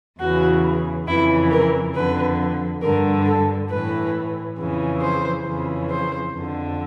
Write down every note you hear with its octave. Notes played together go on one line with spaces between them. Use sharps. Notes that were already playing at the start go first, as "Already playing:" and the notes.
E2 C#3 E3 F#4
F2 C#3 E3 E4
A#4
F2 D3 B4
G2 D3 A#4
A4
A2 E3 B4
F2 C#3 E3
C5
F2 C#3 E3
C5
F2 D3